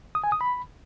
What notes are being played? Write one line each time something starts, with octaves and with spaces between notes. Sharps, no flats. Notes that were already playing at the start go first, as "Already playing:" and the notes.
D#6
G#5
D#6
B5